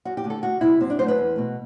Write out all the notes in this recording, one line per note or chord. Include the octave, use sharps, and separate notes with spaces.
F#2 F#4
G4
D3 A3
A4
D2 F#4
C3 G3 E4
F#2 C4
D4
F#3 A3 C5
B4
E2
B2 A3